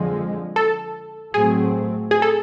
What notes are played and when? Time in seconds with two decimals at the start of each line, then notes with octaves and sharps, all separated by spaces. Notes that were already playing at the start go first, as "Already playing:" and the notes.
Already playing: F2 D3 F3 G#3
0.56 A4
1.33 A2 F#3 A3 C4 G#4
2.11 G#4
2.22 A4